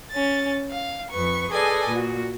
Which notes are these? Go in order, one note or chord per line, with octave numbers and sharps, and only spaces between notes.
C#4 A6
F5
F2 B4 C#6
G#4 A4 B4 D5 D#5 G#5
A#2 F#4